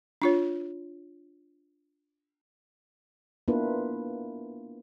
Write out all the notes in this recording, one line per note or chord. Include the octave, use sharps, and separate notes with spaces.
D4 F4 C#5
A#3 B3 D4 E4 F4 B4